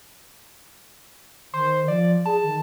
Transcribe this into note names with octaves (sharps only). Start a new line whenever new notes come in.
D#3 C5
F3 D5
G#4 A5
D#3